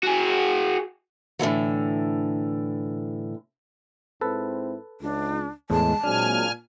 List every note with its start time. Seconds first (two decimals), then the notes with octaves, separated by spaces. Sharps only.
0.03 F#4 G#4
1.39 A2 D3 E3 F#3
4.21 G#2 C4 E4 A4 B4
5.01 C#2 D4
5.70 E2 A2 G#3 A5
6.04 A#2 F#3 G#3 C4 D4 G#5 F6